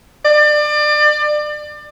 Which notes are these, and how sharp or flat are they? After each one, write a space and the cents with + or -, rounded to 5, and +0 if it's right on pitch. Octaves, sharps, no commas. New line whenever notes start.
D5 +30